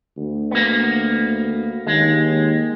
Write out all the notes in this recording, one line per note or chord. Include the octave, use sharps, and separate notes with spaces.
D2
A#3 B3
D#2 G#3